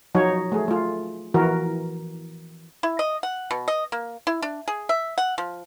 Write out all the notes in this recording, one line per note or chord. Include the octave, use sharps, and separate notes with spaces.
F3 F#3 D#4 C#5
A3 G#4
A3 F4
E3 F3 F#4 A#4
E4
D#5
F#5
B2
D#5
A#3
E4
D4
G#4
E5
F#5
F3